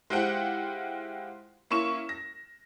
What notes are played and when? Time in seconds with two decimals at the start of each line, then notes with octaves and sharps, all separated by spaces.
0.10 G#3 E4 F4 G4 C5 F#5
1.71 A#3 C#4 E4 C#6 E7
2.09 A#6